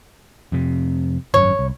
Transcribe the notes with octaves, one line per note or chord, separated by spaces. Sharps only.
F2 C3
G#1 F#2 C#5
C2